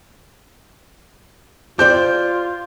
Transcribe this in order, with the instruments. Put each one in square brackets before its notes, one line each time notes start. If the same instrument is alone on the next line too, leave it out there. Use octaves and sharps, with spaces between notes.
[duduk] F4 [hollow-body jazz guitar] G4 C5 D5 [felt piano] G6